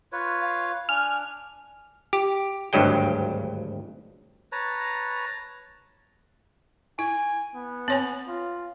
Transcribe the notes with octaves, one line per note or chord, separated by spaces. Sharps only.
F4 B4 C#5
F5
D4 G#5 F6
G4
G#1 D2 G2 F#3 G#3 G5
B4 C#5 A5 A#5
E4 G#5
B3
C4 C#5 G#5
F4